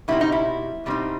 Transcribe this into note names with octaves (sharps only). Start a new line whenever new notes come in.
B2 G3 C4 D#4 E4
D#4
E4
B2 G3 C4 D#4